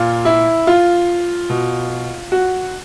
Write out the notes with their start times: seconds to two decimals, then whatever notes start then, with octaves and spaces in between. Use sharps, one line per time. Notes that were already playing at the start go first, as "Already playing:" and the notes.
Already playing: A#2 F4
0.25 E4
0.67 F4
1.50 B2
2.32 F#4